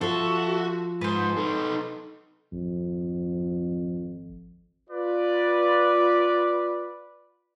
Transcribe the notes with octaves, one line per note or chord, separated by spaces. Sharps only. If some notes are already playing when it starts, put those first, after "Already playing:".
F3 F#4 A4 E5
G#2 B4 C5
D#4 A4
G#1 F2
F4 B4 D5